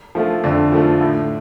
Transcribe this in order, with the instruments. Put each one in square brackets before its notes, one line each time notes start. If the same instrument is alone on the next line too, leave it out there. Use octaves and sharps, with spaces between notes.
[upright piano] F3 A3 F4
[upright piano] F2 [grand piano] D3
[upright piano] F3 A3 F4
A2